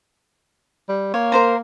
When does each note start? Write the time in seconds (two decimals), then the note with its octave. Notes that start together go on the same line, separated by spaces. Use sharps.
0.89 G3
1.14 A#3 C#5
1.32 A#4 C5 A#5